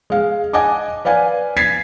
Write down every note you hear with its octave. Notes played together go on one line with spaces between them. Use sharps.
G#3 F5
D#5 F#5 G#5 A5 D6
B4 D5 F5 G#5
G#6 A6 B6 C7